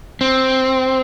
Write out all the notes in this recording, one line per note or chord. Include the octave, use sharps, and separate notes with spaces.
C4